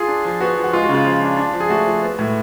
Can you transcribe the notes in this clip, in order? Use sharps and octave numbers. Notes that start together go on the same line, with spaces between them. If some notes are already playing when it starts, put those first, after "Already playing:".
Already playing: F4 G#4
D4
F3
B3 F#4
F3
F#4
G#3 F4
F#4
C#3
F4
F3
D4
D4
F3
G#4
A3 F#4
F3
B3
A2